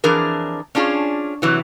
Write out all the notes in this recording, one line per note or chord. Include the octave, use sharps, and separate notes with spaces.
F2 E3 D4 G#4 A#4
C#4 D4 F4 G#4
C3 E3 F#3